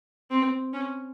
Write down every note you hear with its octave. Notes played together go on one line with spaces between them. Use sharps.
C4
C#4